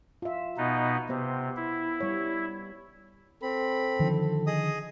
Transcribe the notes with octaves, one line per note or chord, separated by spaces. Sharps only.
F4 E5
B2 B3 D#4
C3 B3 C5
E4
G3 C#5
C4 A4 B5
D3 D#3 F3
G#4 D#5 D#6